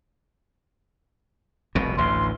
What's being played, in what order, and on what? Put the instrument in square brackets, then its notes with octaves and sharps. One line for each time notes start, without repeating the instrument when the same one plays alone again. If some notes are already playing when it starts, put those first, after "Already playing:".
[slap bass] F1 C2 B2
[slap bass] A1 D2 [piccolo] C6